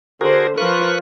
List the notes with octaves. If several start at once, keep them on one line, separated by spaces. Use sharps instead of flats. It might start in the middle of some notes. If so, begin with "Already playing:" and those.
D3 F#4 G#4 A#4 C5
F3 F4 A#4 B4 C#6 F#6